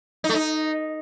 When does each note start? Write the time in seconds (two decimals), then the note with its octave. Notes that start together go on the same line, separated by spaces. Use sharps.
0.24 D#4
0.29 A3
0.35 D#4